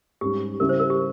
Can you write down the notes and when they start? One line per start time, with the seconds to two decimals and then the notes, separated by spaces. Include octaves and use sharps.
0.21 G#2 G3 C#4 G4
0.60 C#3 G3 C#4 E4 A#4
0.69 C5
0.80 A#4
0.90 G4